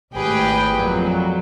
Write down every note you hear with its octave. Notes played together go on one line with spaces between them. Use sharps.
G#1 A2 G4 G#4 B4 G5
F2 A#2 F#3